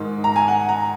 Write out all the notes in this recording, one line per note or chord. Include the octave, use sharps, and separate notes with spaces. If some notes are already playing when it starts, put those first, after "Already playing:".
Already playing: G#2 D#3
A#5
G#5
F#5
A#5